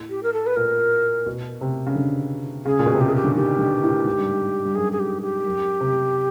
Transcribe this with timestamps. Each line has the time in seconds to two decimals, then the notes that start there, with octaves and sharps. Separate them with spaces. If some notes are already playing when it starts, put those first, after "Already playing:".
Already playing: A2
0.10 G4
0.23 A#4
0.33 A4
0.46 B4
0.56 A#2 A#4
1.26 B2
1.61 C3
1.86 C#3
1.95 D3
2.65 C#3 G#4
2.79 A#2
2.86 B2
2.94 C3
3.01 C#3 G4
3.09 G#4
3.16 G4
3.24 D3
3.35 D#3 G4
3.59 D3
3.83 A2
4.05 G#2
4.18 G2
4.31 G#2
4.65 G2
4.75 F#2 G#4
4.92 G#4
4.99 G4
5.22 G4
5.46 F#2
5.81 C3